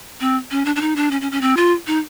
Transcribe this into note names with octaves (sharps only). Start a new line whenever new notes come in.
C4
C#4
D4
D4
D#4
D4
C#4
C#4
C#4
C4
F4
D#4